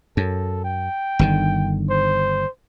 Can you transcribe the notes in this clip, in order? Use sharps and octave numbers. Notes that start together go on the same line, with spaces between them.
F#2 A4
G5
G1 D3 D#3
C5